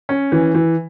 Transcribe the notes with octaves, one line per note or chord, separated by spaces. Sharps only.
C#4
E3
E3